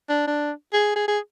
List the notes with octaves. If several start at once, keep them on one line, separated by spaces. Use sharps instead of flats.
D4
D4
G#4
G#4
G#4